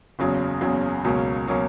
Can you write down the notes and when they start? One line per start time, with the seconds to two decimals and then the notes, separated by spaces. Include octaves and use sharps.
0.19 F#1 E2 C#3 F#3
0.61 F#1 E2 C#3 F#3
1.04 C#2 B2 F#3 A#3 C#4
1.47 B2 F#3 A#3 C#4